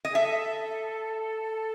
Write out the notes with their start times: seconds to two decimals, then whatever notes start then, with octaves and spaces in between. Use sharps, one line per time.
0.05 D#5
0.10 G#4
0.15 A4 E5